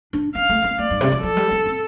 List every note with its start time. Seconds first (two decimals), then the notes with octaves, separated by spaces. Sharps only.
0.13 D4
0.35 C4 F5
0.49 A3
0.64 C4
0.79 A3 D5
0.90 G2
1.01 C3
1.12 F3
1.22 F3 A4
1.37 G3
1.51 C4
1.66 C4